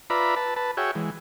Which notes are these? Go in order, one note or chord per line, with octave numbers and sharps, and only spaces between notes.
F4 B4 D5 E5 A#5 B5
B4 A5
B4 A5
F#4 G#4 C#5 E5 G5
E3 G#3